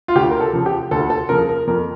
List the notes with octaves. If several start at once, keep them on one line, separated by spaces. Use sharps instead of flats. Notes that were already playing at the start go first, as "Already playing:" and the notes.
F4
D2 G4
A#4
A4
C#3 F3
G4
D2 A4
A4
C#3 F3 A#4
A#4
F2 A#4